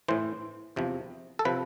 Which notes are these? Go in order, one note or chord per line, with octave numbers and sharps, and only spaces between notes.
A2 E3 C5
E2 C3 F3
A4
C3 F3 B4